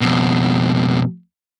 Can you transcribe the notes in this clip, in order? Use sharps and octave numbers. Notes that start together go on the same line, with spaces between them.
F2 B2